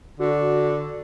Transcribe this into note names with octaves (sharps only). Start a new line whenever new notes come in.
D3 F#4